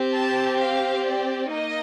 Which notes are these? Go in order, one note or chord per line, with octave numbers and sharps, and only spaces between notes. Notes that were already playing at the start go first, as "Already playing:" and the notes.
Already playing: C4 G4
A5
F5
D5
A#3 D#4 D#5